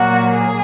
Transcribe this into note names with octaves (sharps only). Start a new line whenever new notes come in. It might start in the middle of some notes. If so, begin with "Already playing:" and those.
Already playing: A#2 F#3 A#3 F#4 F#5
G#4